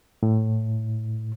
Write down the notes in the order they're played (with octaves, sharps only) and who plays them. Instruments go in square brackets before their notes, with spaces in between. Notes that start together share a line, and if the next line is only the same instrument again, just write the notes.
[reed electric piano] A2